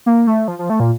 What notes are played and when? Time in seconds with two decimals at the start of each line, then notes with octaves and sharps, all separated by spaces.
0.06 A#3
0.27 A3
0.48 F3
0.59 F3
0.70 A3
0.80 A#2